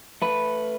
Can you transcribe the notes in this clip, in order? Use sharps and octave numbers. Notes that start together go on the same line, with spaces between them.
A3 B4